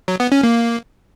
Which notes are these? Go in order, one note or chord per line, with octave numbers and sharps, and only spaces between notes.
F#3
B3
C#4
A#3